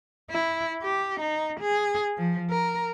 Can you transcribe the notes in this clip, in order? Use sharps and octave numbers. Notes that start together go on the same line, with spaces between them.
E4
G4
D#4
G#4
F3
A#4